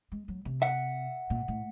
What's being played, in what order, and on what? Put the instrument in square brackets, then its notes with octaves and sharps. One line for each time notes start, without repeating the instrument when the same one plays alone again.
[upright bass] G#3
F#3
C3
[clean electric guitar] E5 F#5
[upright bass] A#2
A2